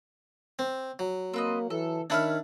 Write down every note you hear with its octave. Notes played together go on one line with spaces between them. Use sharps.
C4
F#3
A#3 C4 B4 D#5
E3 A4
D#3 D4 C#5 E5 B5 F6